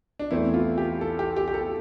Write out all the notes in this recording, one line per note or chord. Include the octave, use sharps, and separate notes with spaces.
D4
E2 E3 A3 C4 E4
F4
G4
A4
G4
G4
G4
A4